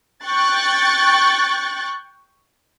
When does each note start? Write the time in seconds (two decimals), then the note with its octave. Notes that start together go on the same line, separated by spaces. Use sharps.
0.25 G5 C#6 F#6 A6